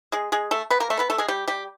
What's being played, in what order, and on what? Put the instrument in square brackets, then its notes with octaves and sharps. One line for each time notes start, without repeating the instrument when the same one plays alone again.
[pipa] G#3 G#4
G#3 G#4
A3 A4
B3 B4
A#3 A#4
A3 A4
B3 B4
A3 A4
G#3 G#4
G3 G4
G3 G4